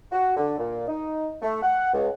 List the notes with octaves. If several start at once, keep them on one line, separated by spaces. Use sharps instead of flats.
F#4
D3
A#2
D#4
A3
F#5
C#2